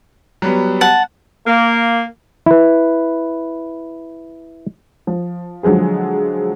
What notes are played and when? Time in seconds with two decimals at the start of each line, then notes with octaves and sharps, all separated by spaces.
0.42 F#3 G3 B3
0.81 F#5 A5
1.47 A#3
2.46 E4 B4
5.07 F3
5.63 D3 F3 F#3 G#3 G#4